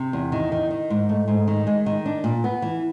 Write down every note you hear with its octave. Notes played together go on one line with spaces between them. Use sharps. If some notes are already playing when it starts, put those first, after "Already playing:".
Already playing: C3
E2
D#3
D#3
D#3
G#2
A3
G#2
D#3
G#3
D#3
D4
A#2
B3
E3